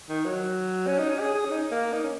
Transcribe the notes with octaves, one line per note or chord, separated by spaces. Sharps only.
D#3
F#3
C#4
D#4
C#4
G#4
G#4
C#4
D#4
A#3
D#4
C#4